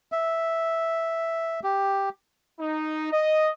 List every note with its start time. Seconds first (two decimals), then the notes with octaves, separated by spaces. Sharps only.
0.12 E5
1.64 G4
2.60 D#4
3.12 D#5